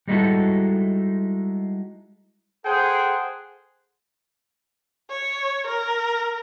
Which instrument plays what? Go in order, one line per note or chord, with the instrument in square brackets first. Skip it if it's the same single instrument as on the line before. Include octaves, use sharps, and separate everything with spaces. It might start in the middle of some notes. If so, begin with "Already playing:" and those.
[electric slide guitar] G3 G#3 D#4 E4 F#4 A4
[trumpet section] G#4 A4 C5 F#5 G5
[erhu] C#5
A#4